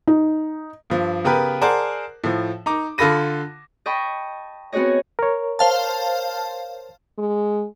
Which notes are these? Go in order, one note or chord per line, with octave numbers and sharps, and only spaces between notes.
D#4
G2 F3
C#3 B3 G4 A#4 B4
G#4 A#4 C5 D5 F#5 A5
A2 F3
D#4 A#5 D6
D3 F4 A4 B5 A#6 D#7
D#5 G5 A5 B5 C#6
B3 C4 F#4 G#4 C#5 D#5
A#4 C#5
C5 F5 A5
G#3